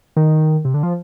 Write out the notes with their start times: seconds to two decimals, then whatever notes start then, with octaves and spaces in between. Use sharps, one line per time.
0.16 D#3
0.65 C3
0.74 D3
0.83 F3